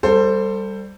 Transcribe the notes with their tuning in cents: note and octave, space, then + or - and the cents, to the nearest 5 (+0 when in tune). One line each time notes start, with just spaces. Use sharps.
G3 +0 A4 +25 C5 +0